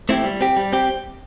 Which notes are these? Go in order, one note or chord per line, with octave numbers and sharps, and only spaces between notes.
A3 C4 E4 G4
G3
C4 G4
G3
C4 G4